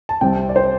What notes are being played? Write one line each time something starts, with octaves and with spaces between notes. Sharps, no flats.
A5
C2 C3 G3 C4 G5
D5
C5